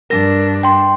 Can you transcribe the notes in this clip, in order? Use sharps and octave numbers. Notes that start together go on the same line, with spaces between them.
G2 D4 A#4 A#6
G5 C6